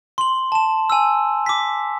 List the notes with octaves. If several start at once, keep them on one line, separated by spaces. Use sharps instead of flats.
C6 F#7
A5 E7
G#5 E6
D6 B6